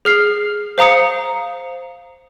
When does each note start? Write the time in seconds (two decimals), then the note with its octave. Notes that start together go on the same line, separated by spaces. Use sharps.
0.05 G#4 F6 C7
0.78 C5 F5 A#5 D#6 C#7